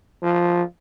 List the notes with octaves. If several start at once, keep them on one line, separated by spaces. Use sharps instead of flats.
F3